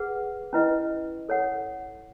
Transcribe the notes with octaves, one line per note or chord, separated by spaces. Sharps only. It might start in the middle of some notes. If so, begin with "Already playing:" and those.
Already playing: G#4 B4 F#5
C#4 E4 B4 D#5
A4 C#5 F#5